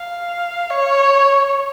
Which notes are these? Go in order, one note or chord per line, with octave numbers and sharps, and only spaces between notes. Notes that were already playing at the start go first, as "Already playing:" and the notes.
Already playing: F5
C#5